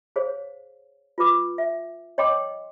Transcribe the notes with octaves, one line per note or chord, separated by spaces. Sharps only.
G#4 C5 C#5 F5
F4 B4 D6
E5
C#5 D#5 G5 C6 D6